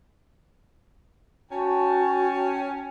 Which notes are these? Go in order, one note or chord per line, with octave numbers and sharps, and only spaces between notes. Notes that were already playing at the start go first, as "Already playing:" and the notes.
C#4 F#4 G5 A5